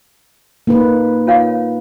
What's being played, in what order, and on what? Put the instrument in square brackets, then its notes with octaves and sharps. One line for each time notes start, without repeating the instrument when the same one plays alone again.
[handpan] A#3 D#4 B4
[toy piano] F4 C#5 F5